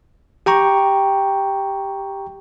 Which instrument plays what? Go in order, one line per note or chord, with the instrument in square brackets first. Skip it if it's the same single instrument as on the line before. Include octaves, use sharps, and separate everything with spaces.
[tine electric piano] G4 G5 A#5 C#6